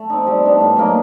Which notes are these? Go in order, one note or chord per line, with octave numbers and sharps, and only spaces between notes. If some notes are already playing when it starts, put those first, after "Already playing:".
Already playing: A3
C4 D#4
G3
B3 D4
A2
F#3 A#3 D#4